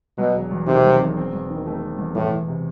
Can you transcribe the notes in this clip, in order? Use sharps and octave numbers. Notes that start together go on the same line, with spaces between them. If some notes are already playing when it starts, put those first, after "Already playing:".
B2 F#3
E1
E2
C3 D#3
F#3
E1
C4
E2
D#3
A3
C4
E2
E2 A2
E2
C3